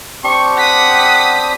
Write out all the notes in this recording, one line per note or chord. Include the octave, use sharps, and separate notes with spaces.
C4 D4 G4 C#6
F#5 D#6 B6